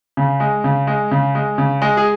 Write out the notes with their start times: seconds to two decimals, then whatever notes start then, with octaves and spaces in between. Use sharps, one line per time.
0.17 C#3
0.40 G#3
0.64 C#3
0.87 G#3
1.11 C#3
1.35 G#3
1.58 C#3
1.82 G#3
1.97 G#4